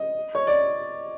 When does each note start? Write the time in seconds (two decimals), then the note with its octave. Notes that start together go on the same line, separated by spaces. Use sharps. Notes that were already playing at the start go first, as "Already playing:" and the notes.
Already playing: D#5
0.35 C#5
0.47 D5